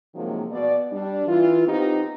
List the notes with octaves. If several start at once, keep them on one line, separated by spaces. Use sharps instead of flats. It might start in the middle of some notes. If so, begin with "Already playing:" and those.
C3 D#3 F3 F#3 G#3 A#3
B2 D5
G3 D4
E3 F4
B3 C4 D#4 G4